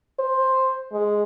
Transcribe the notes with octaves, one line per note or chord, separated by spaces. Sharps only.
C5
G#3